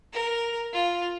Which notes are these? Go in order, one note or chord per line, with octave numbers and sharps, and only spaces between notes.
A#4
F4